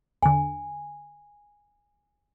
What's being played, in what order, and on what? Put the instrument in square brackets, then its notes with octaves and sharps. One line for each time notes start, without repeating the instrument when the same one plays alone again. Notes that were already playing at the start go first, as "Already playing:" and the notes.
[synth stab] E2 D3 [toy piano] G#5